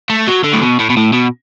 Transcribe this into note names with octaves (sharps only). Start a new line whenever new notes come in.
A3
F#3
D3
A2
B2
A2
B2
A2
B2